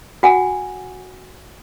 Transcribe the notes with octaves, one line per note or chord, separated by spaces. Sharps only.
F#4 F#5 G#5